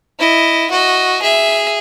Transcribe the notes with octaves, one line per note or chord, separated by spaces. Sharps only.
E4 D#5
F#4 D#5
G#4 E5